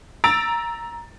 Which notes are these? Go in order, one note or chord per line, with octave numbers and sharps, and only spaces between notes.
A#5 E6 A6 D7